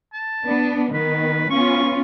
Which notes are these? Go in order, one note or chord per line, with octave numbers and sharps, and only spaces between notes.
A5
B3 D4
D#3 B3 B4
B3 C#4 F4 C#6